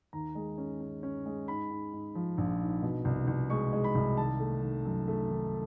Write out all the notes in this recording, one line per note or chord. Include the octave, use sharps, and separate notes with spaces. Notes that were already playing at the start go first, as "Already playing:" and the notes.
D#2 A#5
G#3
C#4
C#4
C#4
G#3
G#2 B5
G#2
G#2
F3
A#1
G#2
B2
C2
C2
G#3 C#6
G#3
B5
C2
D#3 A5
A3
D#3
F#2
A3
D#3